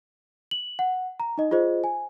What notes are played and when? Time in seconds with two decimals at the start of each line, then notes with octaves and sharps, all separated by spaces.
0.51 F#7
0.79 F#5
1.20 A#5
1.38 D#4 D#5
1.51 F4 G#4 C5 D#5
1.84 G#5